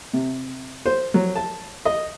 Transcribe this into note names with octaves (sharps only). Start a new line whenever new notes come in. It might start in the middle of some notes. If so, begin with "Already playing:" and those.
C3
C5
F#3
A5
D#5